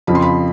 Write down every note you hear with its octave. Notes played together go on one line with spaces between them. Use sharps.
F2 C#3 F3 B5
C6
B5